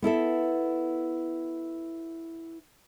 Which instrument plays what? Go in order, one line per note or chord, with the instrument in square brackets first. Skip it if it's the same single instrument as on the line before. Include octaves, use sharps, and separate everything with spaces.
[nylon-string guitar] B3 E4 A4 E5